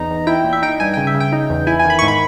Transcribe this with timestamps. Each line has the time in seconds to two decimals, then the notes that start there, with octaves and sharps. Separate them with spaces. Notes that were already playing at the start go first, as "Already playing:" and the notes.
Already playing: E2 D#4 A#5
0.10 E2
0.27 E4 G5
0.45 A#2
0.53 E5
0.62 D#4 G5
0.80 G2 G#5
0.94 C#3 G5
1.07 E5
1.14 C#3
1.20 G5
1.32 D#4
1.50 E2
1.67 E4 G#5
1.79 G#5
1.85 D#3
1.90 B5
1.99 C#6
2.02 G#2
2.08 B5